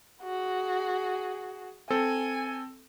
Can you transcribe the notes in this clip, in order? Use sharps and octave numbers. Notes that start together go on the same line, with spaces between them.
F#4 G#4
C4 A4 G#5